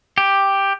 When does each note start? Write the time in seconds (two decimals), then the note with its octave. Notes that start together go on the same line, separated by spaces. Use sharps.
0.18 G4